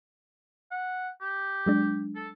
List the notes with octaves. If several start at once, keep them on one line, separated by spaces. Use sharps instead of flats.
F#5
G4
F#3 G#3 D4
A4